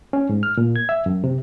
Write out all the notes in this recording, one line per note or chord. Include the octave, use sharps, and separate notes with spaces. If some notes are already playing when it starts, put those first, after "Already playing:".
C#4
G#2
F6
A#2
G#6
E5
F#2
C3